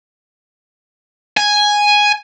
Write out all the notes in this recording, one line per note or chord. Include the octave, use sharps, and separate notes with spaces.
G#5